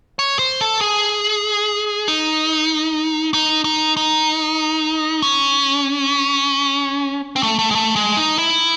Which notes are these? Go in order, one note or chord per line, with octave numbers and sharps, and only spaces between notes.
C#5
C5
A4
G#4
D#4
D#4
D#4
D#4
C#4
C4
A3
A3
G#3
A3
G#3
D#4
E4